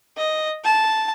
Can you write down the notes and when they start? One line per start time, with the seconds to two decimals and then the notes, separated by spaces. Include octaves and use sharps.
0.17 D#5
0.64 A5